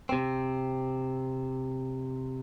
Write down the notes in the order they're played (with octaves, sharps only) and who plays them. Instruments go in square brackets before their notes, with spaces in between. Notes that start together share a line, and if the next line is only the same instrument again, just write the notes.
[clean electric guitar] C3 C4